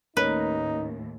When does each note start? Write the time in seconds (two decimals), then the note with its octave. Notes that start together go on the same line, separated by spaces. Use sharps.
0.17 D#2 A2 C#4 D#4 A#4 B4